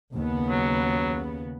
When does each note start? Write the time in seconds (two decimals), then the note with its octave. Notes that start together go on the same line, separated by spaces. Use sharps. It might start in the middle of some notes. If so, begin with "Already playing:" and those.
0.15 D#2 C#3 B3
0.49 F#3